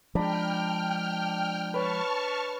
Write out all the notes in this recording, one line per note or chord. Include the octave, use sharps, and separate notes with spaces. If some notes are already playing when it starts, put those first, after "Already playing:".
F3 G#3 D4 G5 A#5 B5 F6
B4 C#5 A5 C#6 F6